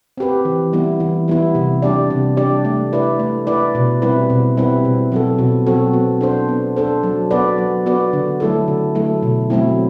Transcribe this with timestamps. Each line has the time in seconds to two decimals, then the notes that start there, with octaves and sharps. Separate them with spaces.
0.17 C4 G4 B4
0.45 E3
0.73 G3 B3 E4
1.00 E3
1.28 G3 B3 E4
1.55 C3
1.82 G3 D4 G4 D5
2.10 C3
2.37 G3 D4 G4 D5
2.65 A3
2.93 E4 B4 D5
3.19 A3
3.47 E4 B4 D5
3.75 B2
4.02 G3 C4 E4 B4
4.30 B2
4.57 G3 C4 E4 B4
4.85 B2
5.12 F#3 C4 F#4 A4
5.39 B2
5.66 F#3 C4 F#4 A4
5.94 B3
6.21 D4 A4 C5
6.48 B3
6.76 D4 A4 C5
7.03 F#3
7.31 B3 F#4 B4 D5
7.58 F#3
7.86 B3 F#4 B4 D5
8.13 D3
8.40 F#3 A3 E4 A4
8.68 D3
8.95 F#3 A3 E4 A4
9.23 B2
9.50 F#3 A3 C4 E4